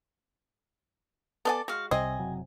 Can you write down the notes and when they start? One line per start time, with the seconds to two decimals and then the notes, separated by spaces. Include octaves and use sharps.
1.45 B3 A4 D5 D#5 G#5 A5
1.68 G#3 F#4 F5
1.91 C2 C3 G3 C4 D#5 G#5
2.19 F#1 C3 F#3